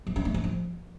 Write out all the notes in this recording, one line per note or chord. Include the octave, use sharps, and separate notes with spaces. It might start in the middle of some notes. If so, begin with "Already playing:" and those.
F3
D4
A3
E3
F3